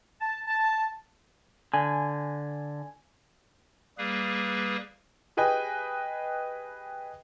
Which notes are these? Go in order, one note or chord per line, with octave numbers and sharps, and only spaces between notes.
A5
A5
D3 G#5
G3 A#3 G#4 B4
G4 G#4 B4 D#5 G5 G#5